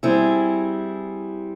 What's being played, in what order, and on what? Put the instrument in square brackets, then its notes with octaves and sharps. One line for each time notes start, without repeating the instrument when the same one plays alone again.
[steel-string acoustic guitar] G3 C4 E4 G#4